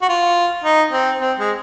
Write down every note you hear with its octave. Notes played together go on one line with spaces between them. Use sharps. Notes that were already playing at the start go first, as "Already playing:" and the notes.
F#4
F4
D#4
C4
C4
G#3